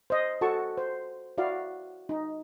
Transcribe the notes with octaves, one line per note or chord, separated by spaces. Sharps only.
C5 D#5
F#4 A4 A5 C#6
C5
E4 F#4 D5 F5
D#4